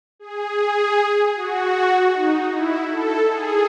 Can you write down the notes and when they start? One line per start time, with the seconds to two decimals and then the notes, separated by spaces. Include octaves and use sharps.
0.19 G#4
1.35 F#4
2.13 D#4
2.51 E4
2.90 A4
3.29 G#4